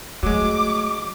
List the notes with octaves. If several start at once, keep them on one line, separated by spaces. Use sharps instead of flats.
F#3 G#3 A3 D6